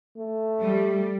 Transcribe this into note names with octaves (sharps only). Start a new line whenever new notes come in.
A3
G3